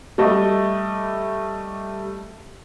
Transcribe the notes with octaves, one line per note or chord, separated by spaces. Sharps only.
G3 A3 D#5